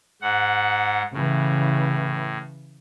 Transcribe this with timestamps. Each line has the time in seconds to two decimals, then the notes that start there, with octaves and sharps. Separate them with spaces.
0.22 G#2 F#5
1.13 A2 C#3 E3